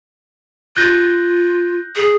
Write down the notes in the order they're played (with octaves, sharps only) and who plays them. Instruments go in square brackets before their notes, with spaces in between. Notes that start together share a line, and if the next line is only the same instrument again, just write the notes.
[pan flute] F4 [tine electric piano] F#6 G6 A#6
[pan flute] G#4